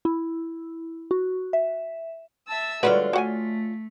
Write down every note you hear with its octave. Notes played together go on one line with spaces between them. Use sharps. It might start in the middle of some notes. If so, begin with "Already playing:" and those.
E4
F#4
E5
E5 A5 E6
D3 G3 G#3 F4 F#4 B4 C#5 D5
A3 F#4 F#5 G#5